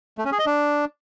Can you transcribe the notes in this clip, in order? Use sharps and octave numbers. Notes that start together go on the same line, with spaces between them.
A3
C#4
G#4
D#5
D4